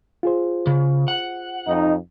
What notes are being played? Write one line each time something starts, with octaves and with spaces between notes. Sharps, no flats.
F4 G#4 C5
C#3
F#5
F2 D#4